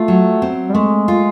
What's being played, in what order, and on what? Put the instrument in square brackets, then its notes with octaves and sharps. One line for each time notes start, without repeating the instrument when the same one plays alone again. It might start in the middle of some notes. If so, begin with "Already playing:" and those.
Already playing: [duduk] A3 [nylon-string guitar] F4
[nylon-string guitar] F#3
C4
[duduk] G3
[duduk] G#3 [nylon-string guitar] A3
[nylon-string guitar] F4